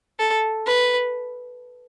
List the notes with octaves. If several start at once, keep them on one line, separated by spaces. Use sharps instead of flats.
A4
B4